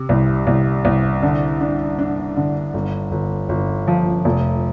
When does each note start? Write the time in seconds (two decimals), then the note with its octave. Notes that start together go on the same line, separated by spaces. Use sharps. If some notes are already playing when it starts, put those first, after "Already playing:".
Already playing: C3
0.09 C2
0.47 C2
0.85 C2
1.22 D3
1.61 D4
1.99 D4
2.37 D3
2.74 G1
3.12 G1
3.49 G1
3.88 F3
4.25 F1